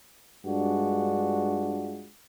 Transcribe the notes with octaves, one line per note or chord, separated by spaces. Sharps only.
G2 G#3 D4 F4 F#4